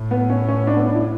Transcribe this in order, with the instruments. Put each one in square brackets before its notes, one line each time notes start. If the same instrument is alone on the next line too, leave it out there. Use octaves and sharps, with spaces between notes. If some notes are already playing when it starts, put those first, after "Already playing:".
Already playing: [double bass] A2
[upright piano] B3
C#4
C#4
D4
B3
D4
E4